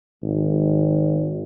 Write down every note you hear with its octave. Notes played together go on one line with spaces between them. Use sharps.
G#1